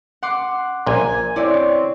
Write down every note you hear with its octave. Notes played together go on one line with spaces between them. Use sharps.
F#5 C6 D6
A#1 A#2 G#5
C4 E4 C#5 D5